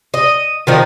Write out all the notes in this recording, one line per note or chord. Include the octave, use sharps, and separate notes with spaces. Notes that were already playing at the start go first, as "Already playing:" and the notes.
D#5
D#3 F3 D#4